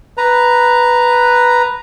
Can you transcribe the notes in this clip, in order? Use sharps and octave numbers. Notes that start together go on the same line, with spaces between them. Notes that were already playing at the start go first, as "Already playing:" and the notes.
B4 A#5